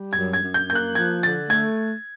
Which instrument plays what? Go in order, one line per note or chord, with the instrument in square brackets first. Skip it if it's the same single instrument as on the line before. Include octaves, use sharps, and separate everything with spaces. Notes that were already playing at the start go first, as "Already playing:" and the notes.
Already playing: [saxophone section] G3
[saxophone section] F#2 [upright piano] G#6
[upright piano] G#6
[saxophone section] F#2
[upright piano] G6
[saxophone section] A#3 [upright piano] G6
[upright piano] F#6
[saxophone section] F3 [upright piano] G#6
[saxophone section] D3 [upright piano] A6
[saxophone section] A3 [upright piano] G#6